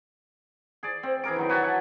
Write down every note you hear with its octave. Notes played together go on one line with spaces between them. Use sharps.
G#4 D5
C4
E3 G#4 A#4 D6
D#3 F#3 D#4
F#4 B4 D5 G#5
E5 F#5 A5